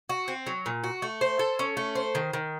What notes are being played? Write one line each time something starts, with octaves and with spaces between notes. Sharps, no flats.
F#4
C4
F#3
A#2
F#4
A3
C5
A4
C#4
A3
C5
D#3
D#3